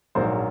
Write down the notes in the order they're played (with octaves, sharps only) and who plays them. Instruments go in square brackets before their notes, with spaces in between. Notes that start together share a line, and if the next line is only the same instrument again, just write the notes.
[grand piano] A#1 G#2 F#3 A#3 C5